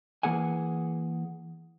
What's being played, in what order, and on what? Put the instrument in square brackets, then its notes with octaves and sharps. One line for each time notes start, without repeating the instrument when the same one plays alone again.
[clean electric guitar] E3 A#3 G#4 F#5 G#5